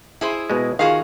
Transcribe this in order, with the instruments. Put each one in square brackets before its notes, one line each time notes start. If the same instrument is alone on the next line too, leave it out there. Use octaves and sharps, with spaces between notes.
[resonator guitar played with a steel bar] E4 G#4 C5
[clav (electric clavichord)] B2 G#3
[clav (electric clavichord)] D#3 F4 [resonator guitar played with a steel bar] F#4 G#4 F5